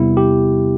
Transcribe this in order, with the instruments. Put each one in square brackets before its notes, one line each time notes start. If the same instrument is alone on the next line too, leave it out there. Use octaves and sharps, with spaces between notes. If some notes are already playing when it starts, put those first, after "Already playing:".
Already playing: [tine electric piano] E2 C3 G3 B3 E4
G4